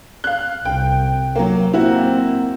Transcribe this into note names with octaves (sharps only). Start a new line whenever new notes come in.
F5 F#6
C2 G5
F#3 A#3
A#3 C4 E4 F#4